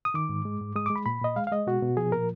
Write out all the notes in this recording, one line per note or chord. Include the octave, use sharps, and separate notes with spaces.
D#6
D#3 D6
G#2
G#3
G#2
G#3 D#6
G#3 D6
B5
A#2 B5
A#2 D#5
G#3 F5
F5
G#3 D#5
B2 F#4
B2
F3 G#4
A#2 A#4